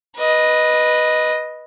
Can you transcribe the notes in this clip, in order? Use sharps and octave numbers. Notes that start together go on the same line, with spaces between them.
B4 D#5